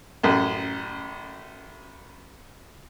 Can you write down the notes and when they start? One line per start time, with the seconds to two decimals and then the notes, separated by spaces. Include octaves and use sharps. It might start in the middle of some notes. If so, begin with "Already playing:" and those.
0.23 A1 F#2